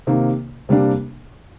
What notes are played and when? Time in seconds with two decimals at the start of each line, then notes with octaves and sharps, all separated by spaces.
0.07 C3 D#3 A#3
0.69 C3 G3 A#3 D4